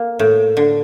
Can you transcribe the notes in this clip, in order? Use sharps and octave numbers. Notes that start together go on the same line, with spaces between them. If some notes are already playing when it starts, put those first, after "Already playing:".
Already playing: A#3
A2
D3